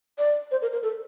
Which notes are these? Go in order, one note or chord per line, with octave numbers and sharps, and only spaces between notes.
D5
C5
A#4
A#4
A4